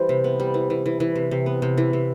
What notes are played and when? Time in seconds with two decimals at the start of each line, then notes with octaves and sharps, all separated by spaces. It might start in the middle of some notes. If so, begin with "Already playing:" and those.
Already playing: E3 G3 C5
0.09 C3
0.24 B3
0.40 G3
0.54 E3
0.70 E3
0.86 E3
1.00 E3
1.16 C3
1.31 C3
1.46 B3
1.62 C3
1.78 E3
1.93 C3